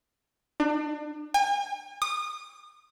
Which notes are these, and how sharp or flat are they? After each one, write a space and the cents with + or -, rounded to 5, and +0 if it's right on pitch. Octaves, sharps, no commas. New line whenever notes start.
D4 +35
G#5 -40
D#6 -30